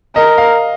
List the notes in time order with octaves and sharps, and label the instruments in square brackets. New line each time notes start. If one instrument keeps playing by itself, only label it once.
[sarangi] A#4 [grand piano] D#5
[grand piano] F5